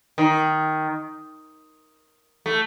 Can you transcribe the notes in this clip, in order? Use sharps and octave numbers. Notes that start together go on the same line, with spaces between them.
D#3
A3